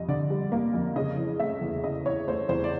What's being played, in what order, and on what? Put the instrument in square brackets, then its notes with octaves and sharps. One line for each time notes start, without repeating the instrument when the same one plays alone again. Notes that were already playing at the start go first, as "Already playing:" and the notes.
Already playing: [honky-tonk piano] F2 G3 D#5
D3 D5
G3
A#3
F2
C#3 D#5
E3
A3 E5
E2
C#3 D#5
E3 C#5
A3 C5
E2 C5
D5